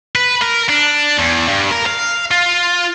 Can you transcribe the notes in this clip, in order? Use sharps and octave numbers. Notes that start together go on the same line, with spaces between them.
B4
A#4
D4
E2
G2
A#4
F5
F4